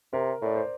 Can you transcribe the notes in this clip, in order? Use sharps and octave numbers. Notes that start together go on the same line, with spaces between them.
C3 A#4
A2 D5
C5